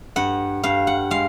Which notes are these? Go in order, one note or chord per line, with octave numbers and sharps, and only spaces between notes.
G2 F#5
G2 F5
F#5
G#3 F5